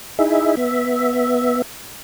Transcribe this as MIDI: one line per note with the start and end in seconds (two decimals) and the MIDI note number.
0.19 0.55 63
0.19 0.55 64
0.19 0.55 68
0.19 0.55 76
0.57 1.62 59
0.57 1.62 76